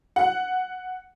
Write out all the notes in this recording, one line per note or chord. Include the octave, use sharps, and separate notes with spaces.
F#5